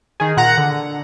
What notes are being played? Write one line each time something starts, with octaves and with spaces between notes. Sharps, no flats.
D#3 G#4
A#2 F#5 A#5
D3